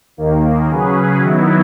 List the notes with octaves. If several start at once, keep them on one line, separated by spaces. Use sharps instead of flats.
D#2 D#3 A#3
C#3 F#3 C#4 G#4 B4
D#3 F#3 B3 E4